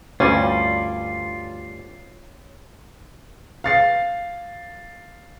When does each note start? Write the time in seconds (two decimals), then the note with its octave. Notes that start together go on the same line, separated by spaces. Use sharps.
0.20 D2 G2 G3 C#4 F4 D5
3.64 F5 A6 C7